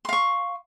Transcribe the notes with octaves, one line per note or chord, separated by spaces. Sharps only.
F5 C6 C#6